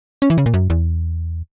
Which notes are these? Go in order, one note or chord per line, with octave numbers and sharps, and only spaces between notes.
C#4
E3
C#3
A#2
F#2
E2